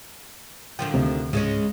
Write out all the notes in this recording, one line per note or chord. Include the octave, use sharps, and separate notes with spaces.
D3 D#3 F3 G5
D2 C3
C#2 G#2 C#3 G#3 C#4